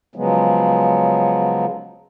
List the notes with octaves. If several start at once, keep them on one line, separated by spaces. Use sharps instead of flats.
C#3 F3 F#3 G#3 B3